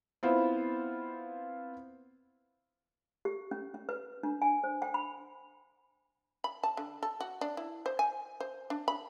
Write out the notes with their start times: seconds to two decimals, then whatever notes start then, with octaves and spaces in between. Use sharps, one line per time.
0.23 B3 C4 E4 F4 C5
3.25 G4
3.51 C#4
3.74 C#4
3.89 B4
4.23 D4
4.42 G#5
4.64 C5
4.82 G5
4.94 B5
6.44 B5
6.63 A5
6.77 D3
7.03 A4
7.20 F#4
7.41 D4
7.57 E4
7.86 C5
7.99 G#5
8.40 C5
8.70 D4
8.88 B5